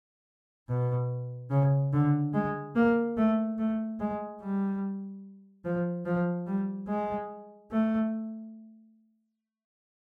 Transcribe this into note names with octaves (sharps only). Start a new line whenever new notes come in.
B2
C#3
D3
G#3
A#3
A3
A3
G#3
G3
F3
F3
G3
G#3
A3